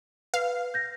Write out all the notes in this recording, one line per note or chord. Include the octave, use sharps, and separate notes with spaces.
B4 F5
G6 A#6